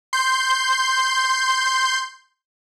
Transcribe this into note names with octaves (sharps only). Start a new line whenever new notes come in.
C6 G6